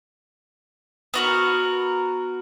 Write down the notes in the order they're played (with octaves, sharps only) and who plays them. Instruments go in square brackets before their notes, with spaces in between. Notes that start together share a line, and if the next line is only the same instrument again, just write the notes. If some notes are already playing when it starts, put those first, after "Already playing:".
[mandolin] B3 F#4 A#4